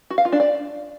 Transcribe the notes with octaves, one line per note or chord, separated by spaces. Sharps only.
F#4
F5
F4
D4
D5